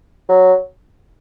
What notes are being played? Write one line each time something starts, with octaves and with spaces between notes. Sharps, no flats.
F#3